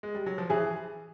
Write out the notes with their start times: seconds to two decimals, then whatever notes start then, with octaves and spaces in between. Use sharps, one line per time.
0.03 G#3
0.15 G3
0.26 F#3
0.38 F3
0.50 E3 G#4